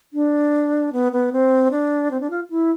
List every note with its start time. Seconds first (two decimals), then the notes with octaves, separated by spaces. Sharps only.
0.13 D4
0.93 B3
1.12 B3
1.33 C4
1.71 D4
2.11 C4
2.21 D4
2.30 F4
2.50 E4